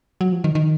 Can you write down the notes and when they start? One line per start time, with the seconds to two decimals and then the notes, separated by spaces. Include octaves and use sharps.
0.21 F#3
0.32 F3
0.44 D#3
0.55 D#3